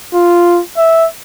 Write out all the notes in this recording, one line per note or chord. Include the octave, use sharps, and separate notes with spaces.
F4
E5